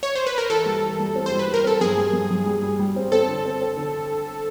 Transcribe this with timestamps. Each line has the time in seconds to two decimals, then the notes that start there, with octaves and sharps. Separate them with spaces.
0.03 C#5
0.15 C5
0.26 B4
0.38 A#4
0.50 E3 A4
0.66 G3
0.83 E3
1.00 G3
1.15 C4
1.26 C5
1.31 G3
1.39 B4
1.48 G3
1.54 A#4
1.64 C4 A4
1.81 G2 G#4
1.97 G3
2.13 G2
2.30 G2
2.46 G3
2.63 G3
2.79 G3
2.96 C4
3.12 C4 A4
3.29 D3
3.45 C4
3.61 C4
3.77 D3